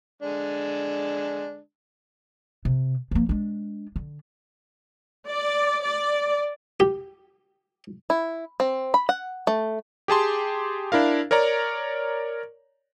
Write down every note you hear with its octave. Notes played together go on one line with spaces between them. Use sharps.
D3 G#3 D4
C3
F3 A#3
G#3 D4
D3
D5
D5
G4
E4
C4
B5
F#5
A3
G4 G#4 A5 C6
D4 E4 A#4 F5
A#4 C#5 D5 A#5